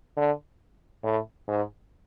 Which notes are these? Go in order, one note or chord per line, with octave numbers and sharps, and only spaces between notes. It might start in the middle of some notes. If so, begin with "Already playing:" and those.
D3
A2
G#2